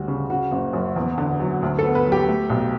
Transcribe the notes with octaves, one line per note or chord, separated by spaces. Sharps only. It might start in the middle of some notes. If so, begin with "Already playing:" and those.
Already playing: D2 G3 F#4
C#3
C#3 F#4
F#1
F#2
E2
D3
F#3
D2
A4
B3
B4
F#3
G4
A3
B1